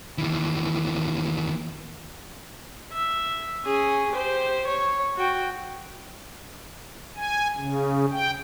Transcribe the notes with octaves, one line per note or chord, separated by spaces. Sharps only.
D#2 E3
E5
C#4 G#4
G4 C5
C#5
F#4 G5
G#5
C#3
G5